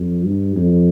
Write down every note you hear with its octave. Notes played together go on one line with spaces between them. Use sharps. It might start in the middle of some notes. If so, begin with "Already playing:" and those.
Already playing: F2
G2
F2